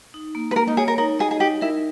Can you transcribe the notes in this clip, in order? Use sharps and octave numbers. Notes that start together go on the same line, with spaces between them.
D#4
A#3
B4
A#3 A#4
D#4
G#4 C#5
A#4
D#4 A#4
G#4 D#5
G#4
D#4 G4
E4 A#4